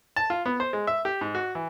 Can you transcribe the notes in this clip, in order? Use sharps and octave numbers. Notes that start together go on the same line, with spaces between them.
A5
F4
B3
C5
G#3
E5
G4
G#2
F#4
E3